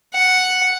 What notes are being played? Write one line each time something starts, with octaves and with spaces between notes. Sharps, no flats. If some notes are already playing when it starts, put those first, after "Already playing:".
F#5